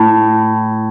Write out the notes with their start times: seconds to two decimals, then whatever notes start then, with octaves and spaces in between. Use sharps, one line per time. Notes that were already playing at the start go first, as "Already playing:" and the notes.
Already playing: A2